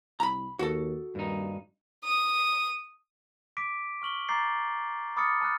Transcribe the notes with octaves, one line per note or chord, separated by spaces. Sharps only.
C2 A#5 B5
D#2 F#4 A4
D#1 G2 D#4
D#6
D6 B6 D7
C#6 F6 F#7 G7
A#5 D6 G6 A6 C7
B5 D6 D#6 F6 A6 C#7
A5 F6 F#6 A6